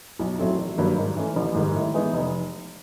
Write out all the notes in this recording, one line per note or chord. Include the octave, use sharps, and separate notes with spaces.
B1
A2 F#3 A3 C4
A1
G2 D#3 F#3 A#3
G#2
E3 A3 C#4
A1
G#2 D#3 G3
A2
E3 G#3 B3 D#4
F1